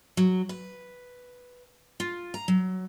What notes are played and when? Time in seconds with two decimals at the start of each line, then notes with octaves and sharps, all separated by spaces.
0.17 F#3
0.49 B4
2.00 F4
2.34 A#5
2.48 F#3